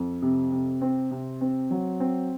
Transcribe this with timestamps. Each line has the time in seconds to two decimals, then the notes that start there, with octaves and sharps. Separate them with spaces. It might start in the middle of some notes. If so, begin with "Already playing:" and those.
Already playing: F2
0.22 C3
0.52 C3
0.81 C4
1.11 C3
1.41 C4
1.71 F#3
2.00 C4